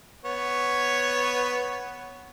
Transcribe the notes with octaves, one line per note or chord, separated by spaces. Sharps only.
B3 C#5